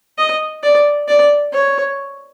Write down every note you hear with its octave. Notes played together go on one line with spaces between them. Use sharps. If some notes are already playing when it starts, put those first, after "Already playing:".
D#5
D5
D5
C#5